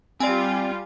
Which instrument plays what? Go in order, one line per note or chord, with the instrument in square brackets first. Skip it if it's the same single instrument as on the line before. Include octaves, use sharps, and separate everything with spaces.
[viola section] G3 F4 [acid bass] C4 [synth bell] D5 G#5